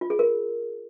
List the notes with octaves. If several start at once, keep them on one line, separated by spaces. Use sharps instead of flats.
F4
G#4
A#4